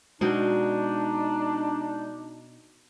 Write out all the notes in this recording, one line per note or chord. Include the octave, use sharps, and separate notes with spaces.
B2 G#3 D4 D#4 F#4 G5